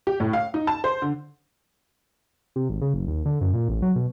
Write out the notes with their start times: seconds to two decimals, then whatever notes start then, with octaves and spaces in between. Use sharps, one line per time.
0.07 G4
0.20 A2
0.33 F5
0.54 D#4
0.67 A5
0.84 C5
1.02 D3
2.56 C3
2.70 G#1
2.81 C#3
2.94 F#1
3.07 D#2
3.25 D3
3.41 F#2
3.53 A#2
3.69 A1
3.82 F#3
3.96 B2